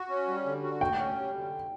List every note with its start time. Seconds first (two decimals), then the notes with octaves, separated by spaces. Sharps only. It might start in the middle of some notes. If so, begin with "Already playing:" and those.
Already playing: F#4
0.09 C#4
0.27 G3
0.45 D3
0.63 F#4
0.81 D2 G5
0.98 C#4
1.17 G3
1.34 D3